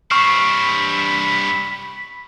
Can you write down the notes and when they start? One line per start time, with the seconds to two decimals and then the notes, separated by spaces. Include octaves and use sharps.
0.11 G2 C4 B5 C#6 F6